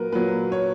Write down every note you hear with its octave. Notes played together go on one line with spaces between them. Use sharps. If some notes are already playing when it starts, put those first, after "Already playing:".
Already playing: A#2 F#3 A#4 B4
A#2 F#3 B4
C#5